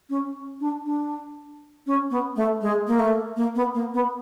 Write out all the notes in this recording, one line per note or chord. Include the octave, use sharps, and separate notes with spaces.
C#4
D4
D4
C#4
B3
A3
G#3
A#3
A3
A#3
B3
A#3
B3